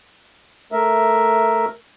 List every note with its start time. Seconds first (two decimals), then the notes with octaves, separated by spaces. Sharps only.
0.72 A3 A#4 E5